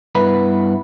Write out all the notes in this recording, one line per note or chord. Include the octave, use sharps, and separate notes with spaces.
G2 B3 E4 B4 B5